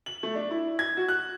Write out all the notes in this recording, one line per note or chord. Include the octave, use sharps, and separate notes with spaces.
F#7
A3
D4
E4
G#6
F#4
F#6